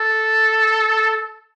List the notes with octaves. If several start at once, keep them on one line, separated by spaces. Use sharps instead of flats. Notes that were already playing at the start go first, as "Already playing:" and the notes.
Already playing: A4